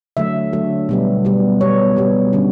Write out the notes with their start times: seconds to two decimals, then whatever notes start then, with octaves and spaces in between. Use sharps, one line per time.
0.17 D3 F#3 A3 E5
0.53 D3 F#3 A3
0.89 B2 G3 B3
1.25 B2 G3 B3
1.61 B2 G3 B3 C#5
1.97 B2 G3 B3
2.33 D3 G3 C#4